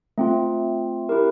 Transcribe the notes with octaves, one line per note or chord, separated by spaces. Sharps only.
A3 C4 F4
E4 G4 A#4